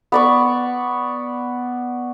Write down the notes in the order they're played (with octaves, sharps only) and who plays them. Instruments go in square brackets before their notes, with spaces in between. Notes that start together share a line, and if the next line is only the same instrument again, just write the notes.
[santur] B3 D5 C#6